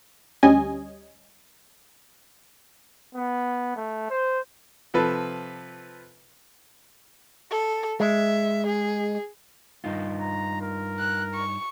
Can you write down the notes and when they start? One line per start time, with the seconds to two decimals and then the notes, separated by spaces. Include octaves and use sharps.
0.43 D2 G3 C#4 D#5 G#5
3.15 B3
3.76 A3
4.10 C5
4.94 C3 F3 A4 B4
7.51 A4
8.00 G#3 E5
8.67 G#4
9.84 G2 D#4 F4
10.20 A#5
10.61 A#4
10.99 F#6
11.34 C#6